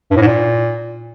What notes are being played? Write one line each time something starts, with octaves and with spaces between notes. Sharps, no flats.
G2
A2
G#2
A#2